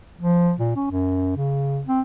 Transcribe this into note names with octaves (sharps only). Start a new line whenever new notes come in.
F3
A#2
C#4
F#2
C#3
C4